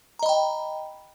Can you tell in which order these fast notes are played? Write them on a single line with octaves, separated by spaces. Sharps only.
A#5 D#5 B5 G5